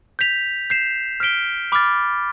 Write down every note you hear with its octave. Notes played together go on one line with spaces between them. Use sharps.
G6 B6 F7
G6 C7 E7
F6 B6 D7 G7
B5 D6 F6 A6